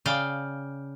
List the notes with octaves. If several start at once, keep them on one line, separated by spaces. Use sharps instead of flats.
C#3 D5 F5 G5